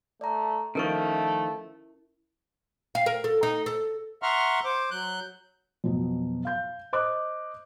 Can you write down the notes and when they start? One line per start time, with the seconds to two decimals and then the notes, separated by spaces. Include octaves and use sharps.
0.21 A3 D5 A#5
0.75 D#3 F3 A3 C#4 E4 A#4 C#6
2.95 F5
3.06 A#4
3.24 A4
3.43 D#4
3.66 A4
4.22 E5 F#5 A#5 C6 C#6 F6
4.65 C5 D6
4.91 F#3 F#6 G6
5.84 F2 B2 F#3
6.45 F5 G6
6.93 C5 D#5 D6 F#6